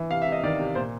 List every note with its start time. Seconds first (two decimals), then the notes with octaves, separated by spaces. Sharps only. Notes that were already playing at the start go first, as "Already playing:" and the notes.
Already playing: E3
0.10 C3 F5
0.22 C3 E5
0.32 D#5
0.43 D#3 D5
0.59 C3
0.75 A#2 C5